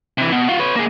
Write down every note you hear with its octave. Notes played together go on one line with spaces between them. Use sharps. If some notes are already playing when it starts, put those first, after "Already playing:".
C3 E3
B2
F4 F#4
B4 C#5
A#3 G#4